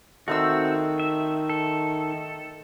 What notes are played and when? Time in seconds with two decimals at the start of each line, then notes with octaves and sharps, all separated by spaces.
0.28 D#3 A3 C4 F#4 C6 E6
1.00 E5
1.49 A4